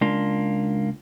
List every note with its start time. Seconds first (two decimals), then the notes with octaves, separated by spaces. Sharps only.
0.01 C#2 A#3 D4 F4